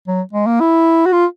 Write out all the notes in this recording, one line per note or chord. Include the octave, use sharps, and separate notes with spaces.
F#3
G#3
A#3
E4
F#4
F4